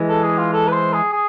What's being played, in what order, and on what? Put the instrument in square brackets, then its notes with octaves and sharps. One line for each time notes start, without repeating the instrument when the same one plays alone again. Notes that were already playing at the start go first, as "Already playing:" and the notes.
Already playing: [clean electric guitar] E3 G#3
[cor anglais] A4
G#4
F4
A4
B4
C5
G#4
G#4